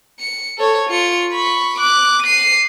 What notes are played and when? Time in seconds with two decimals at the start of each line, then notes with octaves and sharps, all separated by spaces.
0.20 C#7
0.58 A4 C#5
0.90 F4 C#7
1.33 B5 C#6
1.79 D6 F#6
2.23 C7 D#7